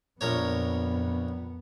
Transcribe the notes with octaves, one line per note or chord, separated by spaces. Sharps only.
A#1 F2 B3 A#4 C#5